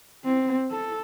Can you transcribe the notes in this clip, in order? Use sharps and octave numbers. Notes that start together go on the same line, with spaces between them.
C4
A4